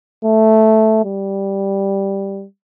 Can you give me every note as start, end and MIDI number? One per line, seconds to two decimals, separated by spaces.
0.25 1.00 57
1.04 2.45 55